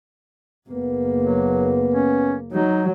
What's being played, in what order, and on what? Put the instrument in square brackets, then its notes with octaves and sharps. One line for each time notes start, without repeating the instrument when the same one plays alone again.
[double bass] F#1 A#3 [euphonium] B3
[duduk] F#3
C#4
[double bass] F#3 [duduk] D#4